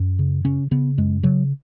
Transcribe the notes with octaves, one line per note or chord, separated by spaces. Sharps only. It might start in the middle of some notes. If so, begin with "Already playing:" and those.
Already playing: F#2
C#3
C#3 C#4
C#3 B3
F#2 G#3
C#3 F#3